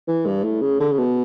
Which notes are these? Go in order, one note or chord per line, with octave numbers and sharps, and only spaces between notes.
E3
G2
A2
C#3
D3
C#3
B2